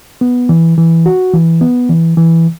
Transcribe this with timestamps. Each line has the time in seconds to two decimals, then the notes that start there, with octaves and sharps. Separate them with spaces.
0.21 B3
0.49 E3
0.78 E3
1.06 F#4
1.34 E3
1.61 B3
1.90 E3
2.17 E3